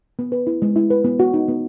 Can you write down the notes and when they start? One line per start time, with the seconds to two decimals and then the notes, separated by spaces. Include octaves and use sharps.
0.19 B3
0.32 B4
0.47 E4
0.62 G#3
0.76 E4
0.90 B4
1.04 B3
1.20 F#4
1.34 D#4
1.48 B3